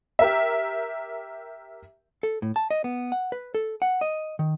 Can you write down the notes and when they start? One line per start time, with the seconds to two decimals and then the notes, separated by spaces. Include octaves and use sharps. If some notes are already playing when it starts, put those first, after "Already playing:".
0.19 G4 A#4 E5
2.23 A4
2.42 A2
2.56 A5
2.71 D#5
2.84 B3
3.12 F#5
3.32 B4
3.55 A4
3.82 F#5
4.01 D#5
4.39 D#3